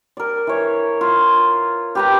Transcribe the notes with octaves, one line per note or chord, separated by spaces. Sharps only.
A#4 D5
E3 C#5
F4
G4 B4 A#5